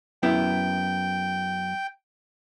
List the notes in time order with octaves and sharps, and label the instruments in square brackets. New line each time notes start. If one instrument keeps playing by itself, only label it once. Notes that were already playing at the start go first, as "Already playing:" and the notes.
[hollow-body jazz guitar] F#2 B3 E4 [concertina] G5